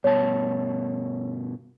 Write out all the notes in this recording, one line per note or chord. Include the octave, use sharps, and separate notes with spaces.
G2 B2 C#5 A5